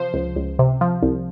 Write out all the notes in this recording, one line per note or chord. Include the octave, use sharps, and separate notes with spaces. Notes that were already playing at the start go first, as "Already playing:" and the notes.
Already playing: C3 F3 C5
C#2
C#2
C3
F3
C2